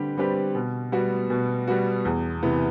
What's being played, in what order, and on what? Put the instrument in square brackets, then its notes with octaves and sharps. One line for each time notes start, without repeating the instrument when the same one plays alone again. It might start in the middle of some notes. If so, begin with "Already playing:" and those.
Already playing: [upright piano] D3 G3 C4 G4 B4
G3 C4 G4 B4
B2
G3 B3 F#4
B2
G3 B3 F#4
E2
C3 E3 B3